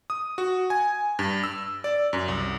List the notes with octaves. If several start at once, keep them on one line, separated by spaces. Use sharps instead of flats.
D#6
F#4
G#5
G2
E6
D5
F#2
C2